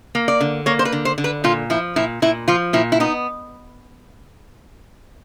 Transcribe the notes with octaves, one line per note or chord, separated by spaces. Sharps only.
A#3
D5
D3
A#3 C#5
C5
B4
D3
C5
D3
B4
A#2 F4
F3 E4
A#2 E4
A#2 E4
F3 F4
A#2 E4
E4
B3 D#4